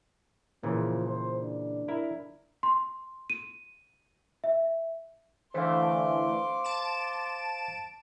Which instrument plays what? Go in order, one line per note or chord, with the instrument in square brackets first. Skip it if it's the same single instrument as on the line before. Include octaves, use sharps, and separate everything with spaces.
[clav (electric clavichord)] A#2 C#3 E3 [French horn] F3
[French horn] C5
D4
[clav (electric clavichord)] E4 A#4
[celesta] C6
D#7
E5
[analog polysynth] D3 E3 A3 [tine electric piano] C5 F5 [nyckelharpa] C6 D6
[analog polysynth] A5 D7 E7